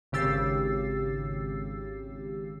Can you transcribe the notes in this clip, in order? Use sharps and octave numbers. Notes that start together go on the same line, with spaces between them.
G#1 C#3 G4 E6 A6 C7